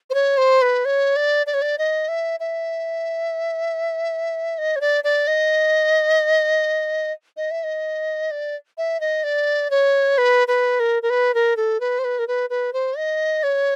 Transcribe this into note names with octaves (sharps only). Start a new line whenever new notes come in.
C5
C#5
C5
B4
C#5
D5
D5
C#5
D5
D#5
E5
E5
D#5
C#5
D5
D5
D#5
D#5
E5
D#5
D5
E5
D#5
D5
C#5
B4
B4
A#4
A#4
B4
A#4
A4
B4
C5
B4
A#4
B4
B4
C5
D#5
C#5